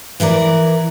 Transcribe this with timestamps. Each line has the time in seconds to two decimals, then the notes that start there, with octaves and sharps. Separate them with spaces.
0.20 E3 E4 A#4 D5